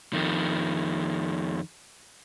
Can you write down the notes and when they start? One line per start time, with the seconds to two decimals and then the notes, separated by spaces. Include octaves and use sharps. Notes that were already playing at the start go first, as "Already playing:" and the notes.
0.13 F2 D#3